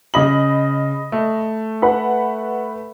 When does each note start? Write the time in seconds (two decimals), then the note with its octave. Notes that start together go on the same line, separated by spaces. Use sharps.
0.14 C#3 D#5 B5 F#7
1.12 A3
1.82 B4 F#5 B5